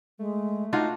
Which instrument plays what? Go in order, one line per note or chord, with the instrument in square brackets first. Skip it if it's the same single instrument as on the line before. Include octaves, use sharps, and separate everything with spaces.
[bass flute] G#3 [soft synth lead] A3
[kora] D4 F4 F#4 [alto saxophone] D#4